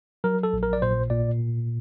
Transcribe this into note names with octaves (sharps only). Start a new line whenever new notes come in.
F#3 A#4
A4
A#1
A#4
D5
A#2 C5
A#2 D5